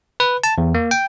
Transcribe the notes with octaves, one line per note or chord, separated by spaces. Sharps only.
B4
A5
E2
A#3
G5